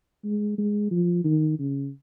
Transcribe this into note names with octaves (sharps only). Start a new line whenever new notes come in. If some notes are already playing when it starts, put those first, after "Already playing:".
G#3
G#3
F3
D#3
C#3